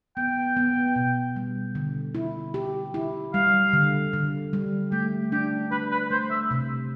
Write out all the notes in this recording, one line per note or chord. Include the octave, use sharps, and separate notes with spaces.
B3 G5
B3
B2
G3
D3
E4
G4
E4
G3 F5
D3
D3
G3
A3 G4
D4 G4
D4 B4
B4
A3 C5
E5
C3